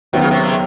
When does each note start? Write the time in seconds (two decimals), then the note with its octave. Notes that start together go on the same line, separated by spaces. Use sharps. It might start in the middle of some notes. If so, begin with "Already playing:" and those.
0.13 D#2 C3 D#3 F#3 B3
0.21 C#3
0.31 C3
0.45 C#3